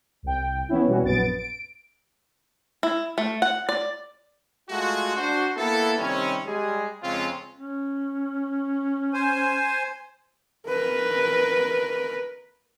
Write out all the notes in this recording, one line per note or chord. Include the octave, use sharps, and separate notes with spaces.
C2 G5
E3 B3 C#4 E4
B2 E3 G3 C#4 F#4
A#1 F#2 B3 A6 D7
D7
E4
A3
F#5
D5
G#3 A3 F4 F#4
D4 F#4 C5
A#3 B3 E4 A4
C3 D#3 G3 C4 C#4
G3 G#3 G#4
F2 C#3 G#3 C4 C#4 F4
C#4
C5 G#5
A#4 B4